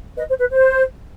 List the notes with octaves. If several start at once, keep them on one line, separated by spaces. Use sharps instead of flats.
B4 D#5
C5
B4
C5